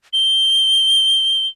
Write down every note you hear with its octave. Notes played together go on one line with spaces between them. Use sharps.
G7